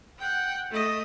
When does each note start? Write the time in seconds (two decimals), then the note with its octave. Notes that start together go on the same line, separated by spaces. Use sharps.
0.18 F#5 G5
0.70 A3 D#5